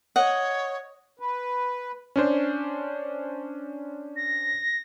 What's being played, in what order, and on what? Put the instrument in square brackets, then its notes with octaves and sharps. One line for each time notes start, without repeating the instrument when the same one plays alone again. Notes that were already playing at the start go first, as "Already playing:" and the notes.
[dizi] C#5 [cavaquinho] D#5 F#5
[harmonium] B4
[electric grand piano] C#4 D4 C5
[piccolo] A#6